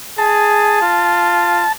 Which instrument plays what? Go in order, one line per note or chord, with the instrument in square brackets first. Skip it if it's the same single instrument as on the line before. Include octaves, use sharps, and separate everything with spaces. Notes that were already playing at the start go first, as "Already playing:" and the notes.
[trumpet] G#4 [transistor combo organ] A5
[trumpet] F4